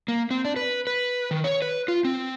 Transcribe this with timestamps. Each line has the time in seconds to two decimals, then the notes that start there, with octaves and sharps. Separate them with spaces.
0.08 A#3
0.31 C4
0.45 D4
0.56 B4
0.87 B4
1.31 D#3
1.44 C#5
1.62 B4
1.88 F4
2.05 C4